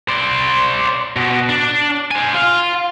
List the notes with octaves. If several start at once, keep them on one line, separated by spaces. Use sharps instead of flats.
C5 D5
B2
D4
C5 G#5
F4 F5